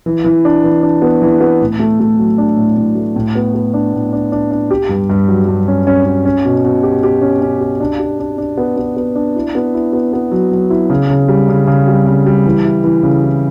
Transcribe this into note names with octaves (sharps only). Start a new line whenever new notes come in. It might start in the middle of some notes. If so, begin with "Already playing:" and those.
E3
E3
D4
E3
D4
B3
E3
B3
A2
A3
A3
F#3
D4
A2
A2
A3
A2
B3
B3
D4
A2
D4
D4
D4
G4
G2
G2
F#3
G2
C#4
C#4
C#4
C#4
B2
B2
G4
G4
C#4
C#4
G4
D4
G4
D4
D4
B3
B3
B3
D4
E4
B3
E4
B3
B3
F#3
F#3
E4
C#3
C#3
G3
C#3
C#3
G3
C#3
G3
E3
E4
E3
C#3
E4